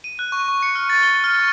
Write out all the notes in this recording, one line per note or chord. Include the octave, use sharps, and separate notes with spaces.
D#7
F#6
C#6
C#6
C#7
F6
A6
G7
F6
C#6